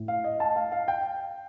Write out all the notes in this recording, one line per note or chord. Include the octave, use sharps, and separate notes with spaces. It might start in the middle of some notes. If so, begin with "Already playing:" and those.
Already playing: A2
F5
D#5
A5
F5
F5
G5